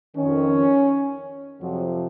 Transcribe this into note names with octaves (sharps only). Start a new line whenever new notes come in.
F2 D#3 C#4
F2 C3 F3 F#3